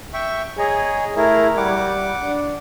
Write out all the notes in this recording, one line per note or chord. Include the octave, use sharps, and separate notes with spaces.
E5 G5 C#6
G#4 C#5 D#5 A#5
A3 E4 G#4 A#4
G3 F#5 D6
D4